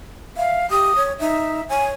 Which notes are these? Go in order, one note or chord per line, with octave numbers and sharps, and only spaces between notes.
E5 F5
G4 D#6
C#5
D#4 E5
C#5 G#5